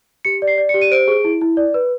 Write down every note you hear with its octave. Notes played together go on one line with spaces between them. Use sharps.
G4 C#7
D5
C7
D5
C#7
G4
D#7
C5 D7
G#4
E4
E4
D5
B4